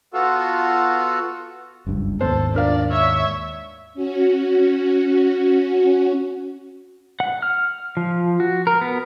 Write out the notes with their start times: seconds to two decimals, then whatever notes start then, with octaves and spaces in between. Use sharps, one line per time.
0.14 B3 F4 F#4 A4
1.87 F#1 C#2 G2
2.21 D#2 G#2 B3 A4 C5
2.54 D4 A#4 D5 F5
2.92 C#5 E5
3.94 C#4 F#4
7.20 F#5
7.42 F6
7.97 F3
8.40 F#4
8.67 A#4
8.81 B3